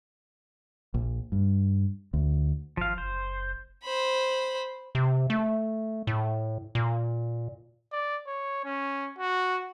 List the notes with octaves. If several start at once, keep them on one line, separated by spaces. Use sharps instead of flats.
A#1
G2
D2
G#1 F3 F5
F#1 C5
C5 B5
C3
A3
A2
A#2
D5
C#5
C#4
F#4